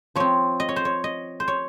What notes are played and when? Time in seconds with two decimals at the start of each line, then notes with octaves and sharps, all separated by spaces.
0.15 F3 C4 C#5
0.60 D#5
0.69 C#5
0.76 C5
0.85 C#5
1.04 D#5
1.40 C5
1.48 C#5